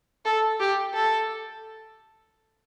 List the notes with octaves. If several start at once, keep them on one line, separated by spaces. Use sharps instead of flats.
A4
G4
A4